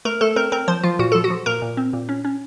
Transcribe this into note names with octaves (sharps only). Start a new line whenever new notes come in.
A3 A#4
A3 A4
C4 A#4
C4 A#4
F3 C5
F3 F4
A#2 F#4
F3 A4
F#4
F3
A#2 A#4
A#2
C4
A#2
C#4
C#4